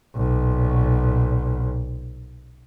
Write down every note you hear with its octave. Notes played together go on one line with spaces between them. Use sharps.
B1 A#2